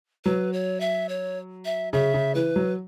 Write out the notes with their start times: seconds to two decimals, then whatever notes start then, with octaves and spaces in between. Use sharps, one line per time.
0.25 F#3 B4
0.53 C#5
0.80 E5
1.09 C#5
1.65 E5
1.93 C#3 E5
2.14 C#3
2.35 E3 B4
2.56 F#3